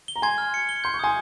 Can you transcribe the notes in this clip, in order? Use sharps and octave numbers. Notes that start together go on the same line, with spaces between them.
G7
A#5
G#5 C6 G#6
F6
C#7
G7
C6 G6
C#6
G#5 C6 D#6